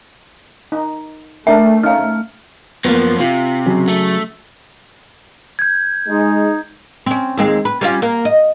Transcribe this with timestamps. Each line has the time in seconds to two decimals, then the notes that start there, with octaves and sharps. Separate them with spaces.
0.72 D#4
1.47 A3 D4 A#4 E5
1.83 C#4 D#4 F5 F6
2.85 F#2 F3 A#3 B3
3.20 C3 F4
3.66 C#3 F#3
3.88 A3
5.59 G6 G#6
6.09 G#3 D#4
7.06 C4 C#4
7.37 D#2 G#3 C4
7.65 B4
7.81 G3 C#4 F4
8.02 A#3
8.25 D#5